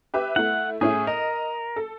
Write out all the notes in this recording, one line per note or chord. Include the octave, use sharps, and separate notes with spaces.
G4 B4 E5
A3 E4 F#5
A2 C#4 E4 G#4
A#4 D#5
A4